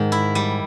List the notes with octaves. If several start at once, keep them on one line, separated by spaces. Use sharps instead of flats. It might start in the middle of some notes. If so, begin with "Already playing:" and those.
Already playing: G#2 D#3
E4
G3